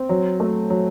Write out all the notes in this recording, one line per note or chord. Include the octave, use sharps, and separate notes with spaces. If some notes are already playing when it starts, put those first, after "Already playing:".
Already playing: C4
F#3
A3
F#3